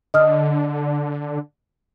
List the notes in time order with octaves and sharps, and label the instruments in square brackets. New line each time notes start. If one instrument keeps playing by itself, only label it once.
[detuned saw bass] D3 [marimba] D#5 D#6 F6